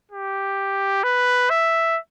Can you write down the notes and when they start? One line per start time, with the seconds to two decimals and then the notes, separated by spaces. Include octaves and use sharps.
0.11 G4
1.03 B4
1.50 E5